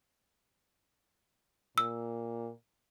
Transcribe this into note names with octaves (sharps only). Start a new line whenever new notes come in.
A#2 E6